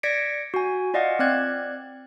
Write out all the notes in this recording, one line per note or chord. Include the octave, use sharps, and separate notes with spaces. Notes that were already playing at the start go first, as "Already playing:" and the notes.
D5 G#6 A#6 B6 C#7 D7
F#4 G#5
F4 D5 D#5 F5 F#5 G#5
C4 D5 F#6 G#6